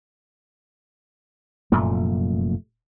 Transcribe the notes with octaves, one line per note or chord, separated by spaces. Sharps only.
F1 F#2 A#2 A3